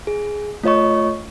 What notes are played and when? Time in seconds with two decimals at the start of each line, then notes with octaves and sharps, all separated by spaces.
0.07 G#4
0.63 A3 F4 C#5 D#5 C#6